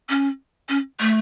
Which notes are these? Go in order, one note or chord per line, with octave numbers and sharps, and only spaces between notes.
C#4
C#4
A3